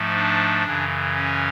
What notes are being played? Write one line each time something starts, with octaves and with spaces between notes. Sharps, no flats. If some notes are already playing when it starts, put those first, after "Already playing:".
Already playing: G#2 F3 A3
D4
F#2 C#3 E3
C#4